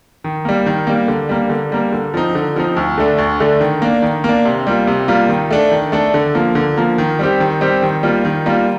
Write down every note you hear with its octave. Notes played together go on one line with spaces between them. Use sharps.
D#3
G3 A#3
D#3
G3 A#3
D3
G3 A#3
D3
G3 A#3
D3
F3 C4 D#4
D3
F3 C4 D#4
D2
D3 A3 D4
D2
D3 A3 D4
D#3
A#3 D4
D#3
A#3
D4
C3
G3 A#3 F4
C3
G3 A#3 F4
D#3
A3 D4 A4
D#3
A3 D4 A4
D3
F3 A#3
D3
F3 A#3
D#3
G3 C4 G4
D#3
G3 C4 G4
D#3
G3 A#3 F4
D#3
G3 A#3 F4